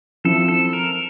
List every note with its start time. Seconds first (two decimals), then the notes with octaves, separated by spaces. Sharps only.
0.24 F3 C4 E4 A4
0.48 A4
0.73 A#4